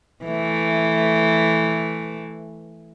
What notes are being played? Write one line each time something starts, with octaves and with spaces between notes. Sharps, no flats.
E3 A3